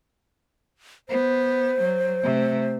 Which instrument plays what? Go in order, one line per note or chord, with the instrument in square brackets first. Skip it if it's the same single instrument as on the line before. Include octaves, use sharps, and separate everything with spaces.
[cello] B3 [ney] C5
[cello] F#3
C3 A3